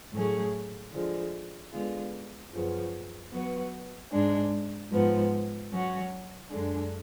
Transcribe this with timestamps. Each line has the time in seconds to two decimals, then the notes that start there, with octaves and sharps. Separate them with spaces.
0.12 A2 F#3 A3 C#4 G#4
0.91 D3 F3 G#3
1.71 D3 G#3 B3 F4 G#4
2.51 F#2 C#3 F3 B3
3.31 F#3 B3 F#4 B4
4.11 G#2 G#3 D4
4.91 G#2 F3 B3
5.70 F#3 C#4 F#4
6.49 F#2 D3 G#3 D4